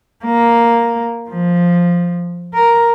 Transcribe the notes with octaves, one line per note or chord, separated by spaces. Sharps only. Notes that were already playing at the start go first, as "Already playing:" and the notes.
A#3
F3
A#4